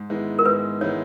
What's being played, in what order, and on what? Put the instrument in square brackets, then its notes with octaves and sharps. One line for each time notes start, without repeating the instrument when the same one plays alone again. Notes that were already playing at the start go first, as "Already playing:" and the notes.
Already playing: [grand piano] G#2
D#3 G#3 B3 E4
[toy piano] A#4
[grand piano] G#2 [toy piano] B4
[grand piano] D#3 G#3 B3 E4 [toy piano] C#5